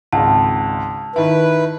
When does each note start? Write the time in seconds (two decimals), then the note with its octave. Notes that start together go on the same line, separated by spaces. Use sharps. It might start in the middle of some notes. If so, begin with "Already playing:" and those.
0.13 G#1 C#2 A5
1.16 D#3 E4 B4